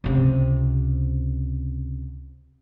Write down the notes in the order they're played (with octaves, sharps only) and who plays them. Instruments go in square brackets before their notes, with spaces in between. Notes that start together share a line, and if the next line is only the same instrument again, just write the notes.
[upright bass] C#2 C3